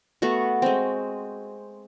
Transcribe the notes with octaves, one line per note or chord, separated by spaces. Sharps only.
A3 B3 F#4
G#3 C4